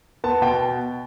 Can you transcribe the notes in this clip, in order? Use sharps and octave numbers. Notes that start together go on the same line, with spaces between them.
B3 A5
B2 G5